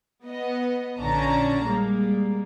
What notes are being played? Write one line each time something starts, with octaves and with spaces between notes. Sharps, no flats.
B3 D#5
A#1 D3 C#4 D4 A5 A#5
G3 G#3 A#3